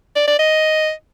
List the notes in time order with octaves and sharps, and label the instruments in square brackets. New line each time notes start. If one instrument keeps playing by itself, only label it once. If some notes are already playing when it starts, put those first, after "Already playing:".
[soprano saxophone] D5
D5
D#5